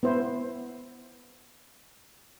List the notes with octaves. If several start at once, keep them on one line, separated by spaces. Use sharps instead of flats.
B3 E4 C5